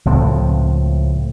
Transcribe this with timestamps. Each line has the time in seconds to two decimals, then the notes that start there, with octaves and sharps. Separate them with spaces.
0.05 C#2 A2 F3 C4